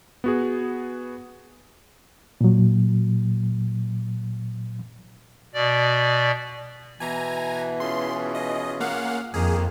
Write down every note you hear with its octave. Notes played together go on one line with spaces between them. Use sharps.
B3 F#4 G#4
A#2 F#3
B2 D5
B2 E3 G#5 A#5
C#4 F4 G#4 C6
D#5
A#3 F5 F#5
F2 D#3 A#3 G#4